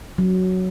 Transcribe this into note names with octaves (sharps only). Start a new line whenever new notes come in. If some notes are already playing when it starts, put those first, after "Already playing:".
F#3